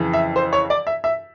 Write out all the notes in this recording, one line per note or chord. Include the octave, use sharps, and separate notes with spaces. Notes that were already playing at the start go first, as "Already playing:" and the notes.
Already playing: F2 C#3 E3
E5
C5
C#5
D5
E5
E5